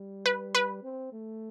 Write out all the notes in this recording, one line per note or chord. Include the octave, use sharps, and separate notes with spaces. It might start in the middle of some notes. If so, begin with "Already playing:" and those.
Already playing: G3
B4
B4
C4
A3